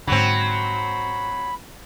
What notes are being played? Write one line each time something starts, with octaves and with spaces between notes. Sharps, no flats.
G#2 D3 F#3 C4 B5